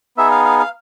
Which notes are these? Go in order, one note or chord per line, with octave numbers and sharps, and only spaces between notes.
B3 D#4 G#4 E5
F5
F5
F5